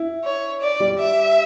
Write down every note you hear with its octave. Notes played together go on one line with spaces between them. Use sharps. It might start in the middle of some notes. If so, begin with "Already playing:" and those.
Already playing: E4
C#5
D5
G3
E5